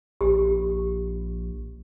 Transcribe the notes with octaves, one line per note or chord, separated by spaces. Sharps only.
A#1 G4